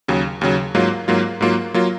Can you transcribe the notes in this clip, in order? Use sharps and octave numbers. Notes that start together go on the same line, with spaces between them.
D#2 C#3 F#3
D#2 C#3 F#3
G#2 F#3 A#3 F4
G#2 F#3 A#3 F4
G#2 F#3 A#3 F4
F#3 A#3 F4